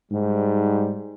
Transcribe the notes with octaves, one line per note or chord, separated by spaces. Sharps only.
G#2 G3